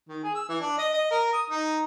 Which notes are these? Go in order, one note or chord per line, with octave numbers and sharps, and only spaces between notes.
D#3
G#4
E6
E3
D4
D#5
D#5
A#4
D#6
D#4